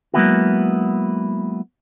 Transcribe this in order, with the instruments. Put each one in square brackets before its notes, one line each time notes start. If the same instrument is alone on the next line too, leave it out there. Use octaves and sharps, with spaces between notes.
[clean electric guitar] F#3 G#3 A#3 B3 E4 F#4